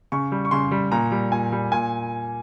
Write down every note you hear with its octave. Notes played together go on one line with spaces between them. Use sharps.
C#3 C#6
G3
C#6
C#3 C6
G3
A#2 A#5
G3
A#2 G#5
G3
A#2 G#5